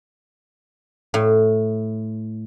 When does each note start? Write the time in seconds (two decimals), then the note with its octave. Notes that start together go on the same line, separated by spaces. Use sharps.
1.14 A2